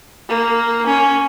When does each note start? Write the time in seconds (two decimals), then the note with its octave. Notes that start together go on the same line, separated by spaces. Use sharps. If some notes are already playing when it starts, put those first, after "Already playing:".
0.29 A#3
0.86 C#4